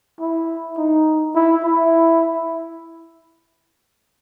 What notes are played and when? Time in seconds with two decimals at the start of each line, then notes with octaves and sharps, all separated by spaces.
0.20 E4
0.78 D#4
1.36 E4
1.64 E4